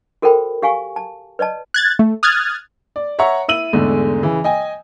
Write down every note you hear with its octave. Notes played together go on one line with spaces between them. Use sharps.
F#4 A4 A#4 C5 G5 B5
G4 F5 G#5 C#6
A5
B4 D5 D#5 A5
F#6 G#6 A6
A3
D#6 F6 F#6 G#6 A6
D5
C#5 E5 F#5 A#5 C#6
E4 E6 D#7 F#7
E2 G#2 D3 A3
C#3 E3
D#5 G5 G#5